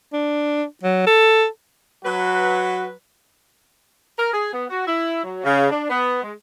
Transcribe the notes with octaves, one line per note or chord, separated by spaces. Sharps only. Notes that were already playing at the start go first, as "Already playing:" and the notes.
D4
F#3
A4
F#3 F#4 B4
A#4
G#4
B3
F#4
E4
F#3
C#3
D4
B3
G#3